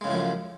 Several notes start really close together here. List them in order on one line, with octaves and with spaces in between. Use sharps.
G#3 C#3 A2 F3 F#2